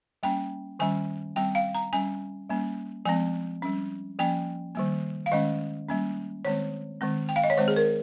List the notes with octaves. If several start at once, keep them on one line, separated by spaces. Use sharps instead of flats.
G3 A#3 C#4 G5
D#3 G3 C#4 G#5
G3 C4 G5
F5
A#5
G3 C#4 G#5
G3 A#3 C#4
F3 G#3 C4 G#5
G3 C#4
F3 A#3 C#4 G5
D#3 G3 A#3
F5
D#3 G#3 C#4 D#5
G3 A#3 C#4
D#3 G#3 C4 C#5
D#3 G#3 C4
G5
F5
D#5
C#5
D#3 G#3 C4 C5
G#4
A#4